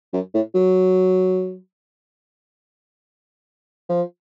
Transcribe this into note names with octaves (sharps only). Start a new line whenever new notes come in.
F#2
A2
F#3
F3